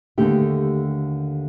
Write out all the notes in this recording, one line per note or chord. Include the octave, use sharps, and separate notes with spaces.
D#2 D3 A3 G4